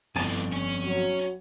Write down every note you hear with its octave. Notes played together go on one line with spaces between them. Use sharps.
G1 F2 D3 E3 G#5 A5
C#4
F#3